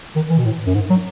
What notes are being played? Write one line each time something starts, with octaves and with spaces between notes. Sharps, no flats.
D#3
E3
B2
A2
F#2
G#2
F#3